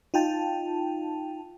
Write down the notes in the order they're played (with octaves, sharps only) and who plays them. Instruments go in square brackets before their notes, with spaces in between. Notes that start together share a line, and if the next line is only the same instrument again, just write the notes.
[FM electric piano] D#4 F4 G5 A5